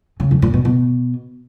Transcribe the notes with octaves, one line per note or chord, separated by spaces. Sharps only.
C#3
F2
A#2
B2
B2